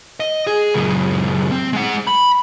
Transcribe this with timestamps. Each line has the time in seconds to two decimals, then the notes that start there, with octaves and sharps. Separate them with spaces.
0.20 D#5
0.47 G#4
0.74 C#2 F#2
1.52 C4
1.73 G#3 F#5
2.07 B5